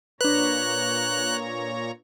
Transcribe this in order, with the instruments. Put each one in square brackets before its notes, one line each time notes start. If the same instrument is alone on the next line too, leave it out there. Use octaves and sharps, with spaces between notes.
[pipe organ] A#2 C#5 A#5 [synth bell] D4 B4 [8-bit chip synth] F#6